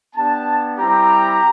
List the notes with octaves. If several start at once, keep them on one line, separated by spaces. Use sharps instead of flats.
B3 D4 G4 A5
G3 C4 E4 G4 A#5